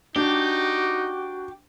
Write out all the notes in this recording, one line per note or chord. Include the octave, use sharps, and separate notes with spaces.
D4 D#4 F#4 G4